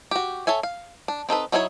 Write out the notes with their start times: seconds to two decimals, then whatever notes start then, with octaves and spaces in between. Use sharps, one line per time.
0.11 F#4 G4
0.47 A4 C#5 E5 G#5
0.63 F5
1.08 D4
1.29 C4 D#4 A4 B4
1.52 F#3 D#4 E4 A4 C#5